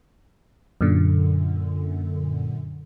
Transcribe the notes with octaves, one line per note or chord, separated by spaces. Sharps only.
F#2 A#2 D3